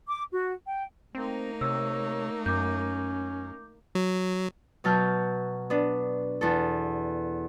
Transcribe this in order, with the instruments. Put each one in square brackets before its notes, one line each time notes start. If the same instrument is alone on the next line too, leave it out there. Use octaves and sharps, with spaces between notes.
[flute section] D6
F#4
G5
[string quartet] A3 A#3 D#4 [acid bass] C4
[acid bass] C3 [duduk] C#5 [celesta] E6
[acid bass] F#2 [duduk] C#4 [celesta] D6 G6
[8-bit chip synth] F#3
[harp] B2 F#3 A5 F6 G6
B3 D4
E2 A4